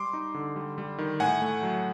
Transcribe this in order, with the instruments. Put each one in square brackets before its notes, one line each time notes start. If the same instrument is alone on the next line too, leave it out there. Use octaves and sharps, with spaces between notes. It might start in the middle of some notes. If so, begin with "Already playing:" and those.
Already playing: [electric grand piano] G3 C6 D6
D#4
D3
G3
G3
D#3
A2 F#5 G#5
A3
F#3